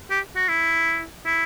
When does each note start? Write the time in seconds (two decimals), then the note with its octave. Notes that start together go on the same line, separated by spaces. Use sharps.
0.10 G4
0.36 F#4
0.48 E4
1.26 E4